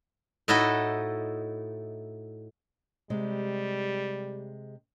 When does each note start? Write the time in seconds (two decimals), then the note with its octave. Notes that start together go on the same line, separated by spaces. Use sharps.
0.48 A2 D#4 E4 F#4 A4 D#5
3.10 C3 G3 G#3